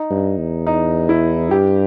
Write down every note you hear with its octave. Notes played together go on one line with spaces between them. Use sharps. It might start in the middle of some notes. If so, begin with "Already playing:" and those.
Already playing: D#4
G2
E2
D#4
E4
G2 G4